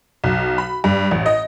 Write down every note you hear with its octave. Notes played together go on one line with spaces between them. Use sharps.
B1
B5
G2
A1
D#5